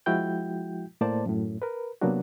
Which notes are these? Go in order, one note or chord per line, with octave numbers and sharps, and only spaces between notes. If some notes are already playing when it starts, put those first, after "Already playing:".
F3 G#3 E4 F#4 G5 G6
A2 A#3 C5 D5 A5
F#2 A2
A#4 B4
C3 F#3 A#3 B3 D4 F#4